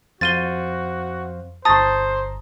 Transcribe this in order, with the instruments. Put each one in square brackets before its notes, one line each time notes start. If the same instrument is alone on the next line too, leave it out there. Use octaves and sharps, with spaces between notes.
[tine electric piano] F2 C5 F5 [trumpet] F#4 [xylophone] A6 D#7 G7
[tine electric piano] G1 A#5 [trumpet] C5 [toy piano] A5 C#6 [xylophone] D#6 A6